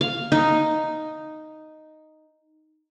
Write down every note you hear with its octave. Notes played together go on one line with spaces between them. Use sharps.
F5
D#4